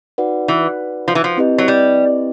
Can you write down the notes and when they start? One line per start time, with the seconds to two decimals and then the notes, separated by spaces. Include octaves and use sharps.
0.18 D#4 F#4 B4 D5 F#5
0.48 E3
1.08 F3
1.15 E3
1.24 F3
1.37 C4 E4 G4 B4 D#5
1.58 F#3
1.68 G3